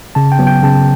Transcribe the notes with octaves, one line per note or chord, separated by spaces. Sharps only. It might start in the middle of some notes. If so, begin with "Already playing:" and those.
C#3 A5
G5
F#3 B3
G5
C#3 A5